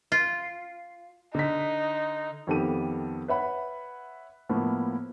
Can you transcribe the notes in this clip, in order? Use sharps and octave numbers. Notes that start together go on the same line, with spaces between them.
F4
D3 D#4 B6
F2 D#3 B3 G4 A4 D#7
B4 C#5 E5 F#5 B5
A2 F3 A#3 B3